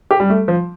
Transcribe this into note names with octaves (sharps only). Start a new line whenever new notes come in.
G4
G3
A3
F3